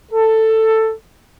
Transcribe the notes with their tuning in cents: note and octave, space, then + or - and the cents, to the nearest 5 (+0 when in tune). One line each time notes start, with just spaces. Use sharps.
A4 +10